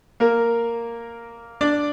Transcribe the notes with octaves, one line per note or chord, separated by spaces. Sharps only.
A#3 A#4
D4 D5